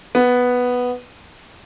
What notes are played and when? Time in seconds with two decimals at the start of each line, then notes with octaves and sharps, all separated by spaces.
0.15 B3